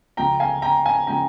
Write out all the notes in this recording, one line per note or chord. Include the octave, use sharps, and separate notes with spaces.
C#2 C#3 F3 G#3 G5 A#5
F5 G#5
G5 A#5
F5 G#5
C#3 F3 G#3 G5 A#5